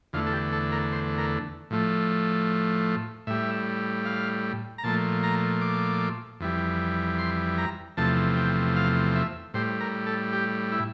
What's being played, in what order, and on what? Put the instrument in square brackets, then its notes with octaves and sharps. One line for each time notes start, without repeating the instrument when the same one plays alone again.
[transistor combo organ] E2 D3 A3 F4
A4
G4
A4
A#4
C5
A#4
A2 F3 A3
A2 G3 E5
F5
A#5
A#2 F3 A3 A5
A#5
D6
F2 E3 G3
C6
A#5
E2 C3 F3 A3 A5
G5
F5
E5
A2 G3 C5
A#4
A4
G4
E4